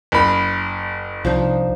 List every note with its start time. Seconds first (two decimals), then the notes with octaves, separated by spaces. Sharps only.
0.12 F#1 B5
1.25 C2 F3 D4 D#4